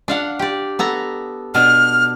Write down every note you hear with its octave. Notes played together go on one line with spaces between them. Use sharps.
D4 F5 F#5
G4 D5
B3 A4 A#5
B2 D4 F6